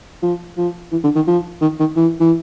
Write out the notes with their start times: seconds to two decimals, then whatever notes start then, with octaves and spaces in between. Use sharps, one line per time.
0.22 F3
0.57 F3
0.92 E3
1.04 D3
1.15 D#3
1.27 F3
1.61 D#3
1.79 D#3
1.96 E3
2.20 E3